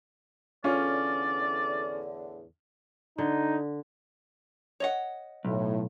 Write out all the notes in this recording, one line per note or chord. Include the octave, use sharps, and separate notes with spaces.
E2 A2 D3 C#4 F4 D5
D3 D#4
C#5 D#5 F#5
B1 A2